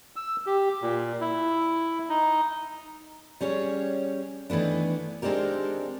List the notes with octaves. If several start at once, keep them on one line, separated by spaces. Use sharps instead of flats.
E6
G4
A#2
E4
D#4
G3 C#4 G#4 C#5
D#3 E3 A3 B3 D4
G#3 C4 D4 D#4 G4 A#4